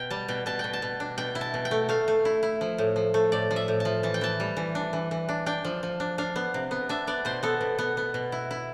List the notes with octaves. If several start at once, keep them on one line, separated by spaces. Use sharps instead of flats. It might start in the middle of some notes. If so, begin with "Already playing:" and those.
Already playing: B2 G5
G3 A5
B2 G5
B2 A5
B2 G5
A5
B2
D4
B2 G5
E4
A5
B2
G5
A3
A3 F5
A3
E4
E4
F3
A2
F3
A3
A2 D5
F3
E5
A2
A5
F3
E3 A5
G5
E3 A5
G3
E3
D4
E3
E3
D4
D4 G5
F3
F3
D4
D4 F5
B3
C3
B3
D4 E5
B3 D5
B2 C5
B3 A4
B2
B3
B3
B2
E4
E4